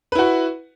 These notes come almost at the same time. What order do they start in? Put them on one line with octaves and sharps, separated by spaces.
B4 E4 F#4